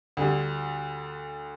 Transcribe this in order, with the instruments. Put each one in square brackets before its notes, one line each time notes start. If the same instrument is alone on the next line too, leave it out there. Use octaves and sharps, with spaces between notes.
[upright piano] D2 D3 G3